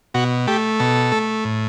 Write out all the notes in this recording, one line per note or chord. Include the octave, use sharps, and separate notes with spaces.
B2 F#4
A3 G4
B2 A4
A3
A2